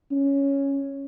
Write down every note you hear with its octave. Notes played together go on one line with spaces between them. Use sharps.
C#4